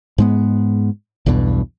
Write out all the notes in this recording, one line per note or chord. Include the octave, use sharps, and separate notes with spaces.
G#2 G#3 B3
B1 E2 G2 B2